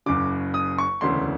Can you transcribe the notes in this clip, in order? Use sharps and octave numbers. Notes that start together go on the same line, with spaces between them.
F#1 F#2 C#3 D6
D#6
C#6
E1 D2 C#3 E3 C6